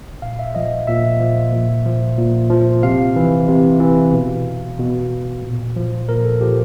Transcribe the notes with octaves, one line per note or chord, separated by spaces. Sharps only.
A#2 F5
E5
F3 D#5
A#2 E5
F3
A#2
F3
A#2
F3
C3 F5
E3
C3
E3
B2
B2
A#2
F3
A#2 A#4
A4
F3 G4